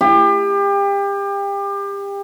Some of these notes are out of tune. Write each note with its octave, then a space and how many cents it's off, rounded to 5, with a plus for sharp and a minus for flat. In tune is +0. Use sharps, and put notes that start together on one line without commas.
G4 +30